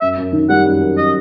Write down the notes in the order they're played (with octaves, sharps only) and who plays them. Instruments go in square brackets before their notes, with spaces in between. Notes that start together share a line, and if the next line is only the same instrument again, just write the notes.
[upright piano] F#2 [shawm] E5
[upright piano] F#2
D#3
[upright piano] G3 [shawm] F#5
[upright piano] F#2
F#2
[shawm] D#5